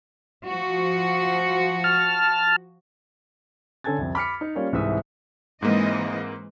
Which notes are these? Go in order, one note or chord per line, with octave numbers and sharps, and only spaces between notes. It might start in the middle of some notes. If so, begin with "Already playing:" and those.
F3 F#4
A5 F6
D3 C#4 A4 G#5 G#6 A6
C2 F2
B5 D6 F6 B6 C#7
D#4
G3 A#3 C#4 F4 D5
C2 G#2 E3 E5 D#6
G#2 E3 G#3 A#3 C4 D#5